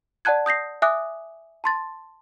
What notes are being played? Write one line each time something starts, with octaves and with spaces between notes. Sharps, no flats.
D5 F#5 A5 F#6 G#6
D#6 G6 A#6 C7
E5 G#5 D6 D#6 F#6
A5 C6 A6